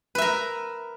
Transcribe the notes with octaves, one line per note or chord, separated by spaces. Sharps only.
A#4 B4 E5